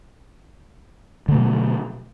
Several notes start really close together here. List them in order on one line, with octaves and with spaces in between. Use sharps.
D3 A3 B2 F#3